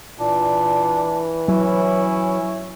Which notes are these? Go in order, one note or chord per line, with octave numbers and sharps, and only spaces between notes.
A#2 E3 D4
F#3 C#4 E4